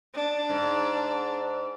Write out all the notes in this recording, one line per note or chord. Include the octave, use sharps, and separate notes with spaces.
D4
G#2